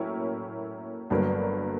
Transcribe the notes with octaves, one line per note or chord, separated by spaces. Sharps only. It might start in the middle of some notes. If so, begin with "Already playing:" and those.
Already playing: A2 F#3 A#3 C#4 E4
G1 G2 D3 F#3 A#3